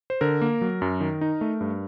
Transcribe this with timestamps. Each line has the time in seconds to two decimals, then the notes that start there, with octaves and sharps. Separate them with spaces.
0.10 C5
0.21 D3 A#4
0.41 A#3
0.61 F#3
0.82 F#2
1.01 D#3
1.21 D#4
1.41 A3
1.61 G2